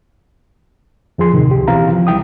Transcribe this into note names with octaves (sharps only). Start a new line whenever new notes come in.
F2 F3 G#4 C6
D#2 A2 C3 D#3
C#2 G4
B2 E3 C4 F5 A#5
F3
C2 G3 E4 G5 D#6